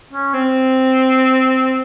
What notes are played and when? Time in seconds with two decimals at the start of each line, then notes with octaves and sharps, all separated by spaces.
0.13 C#4
0.34 C4